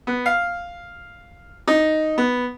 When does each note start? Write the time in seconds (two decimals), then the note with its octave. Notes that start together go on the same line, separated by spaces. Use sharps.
0.07 B3
0.26 F5
1.68 D#4
2.18 B3